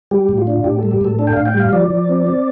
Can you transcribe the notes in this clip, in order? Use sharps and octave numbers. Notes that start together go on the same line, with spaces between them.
G3 G4
A2
F4
D4
A2 G4
G3 A4
G4
A2 A4
D4 A4
G5
A2 F5
G5
G3
F5
F3 D5
F3
C4
C4